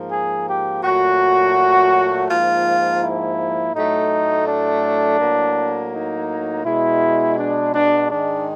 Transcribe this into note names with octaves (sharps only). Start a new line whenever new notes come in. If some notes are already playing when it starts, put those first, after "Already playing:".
Already playing: G#2 F3 A#3
G#4
G4
A#2 F#3 A3 F#4
G#2 F3 A#3 F4
E4
A2 F#3 A3 D#4
D4
A2 F#3 A#3
D#4
B2 G#3 E4
D4
D4
G#2 D#3 G#3 D4